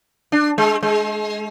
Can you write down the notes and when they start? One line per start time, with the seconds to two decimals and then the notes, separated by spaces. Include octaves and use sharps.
0.32 D4
0.58 G#3
0.83 G#3